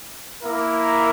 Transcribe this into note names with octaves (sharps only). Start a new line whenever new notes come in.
A#3 E4 A#4